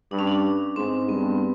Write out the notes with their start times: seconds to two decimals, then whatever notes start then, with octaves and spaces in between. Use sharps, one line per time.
0.11 G2 D4
0.19 C#4
0.27 D4
0.76 G#2 C4
1.09 G2 B3